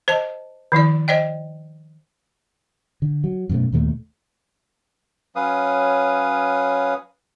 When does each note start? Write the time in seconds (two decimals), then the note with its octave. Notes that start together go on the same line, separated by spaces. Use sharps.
0.08 C5 D#5 A5
0.72 D#3 F3 E4 D5
1.08 C5 D5 D#5 G5
3.02 D3
3.24 F#3
3.49 F#2 B2 A3
3.72 D#2 A#2 G#3 A3
5.36 F#3 C#4 B4 F5 D#6